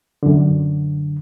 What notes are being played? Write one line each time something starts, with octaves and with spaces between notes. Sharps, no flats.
F#2 D3